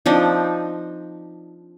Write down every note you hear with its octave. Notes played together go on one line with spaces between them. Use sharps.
F3 C4 D4 D#4